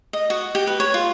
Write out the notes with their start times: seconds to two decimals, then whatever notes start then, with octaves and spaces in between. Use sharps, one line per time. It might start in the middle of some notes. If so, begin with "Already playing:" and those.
0.13 D#5
0.30 F#4
0.55 G4
0.67 B4
0.80 C#5
0.94 F4